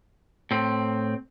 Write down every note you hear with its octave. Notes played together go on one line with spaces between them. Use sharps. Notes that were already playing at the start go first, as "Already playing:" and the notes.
A2 C4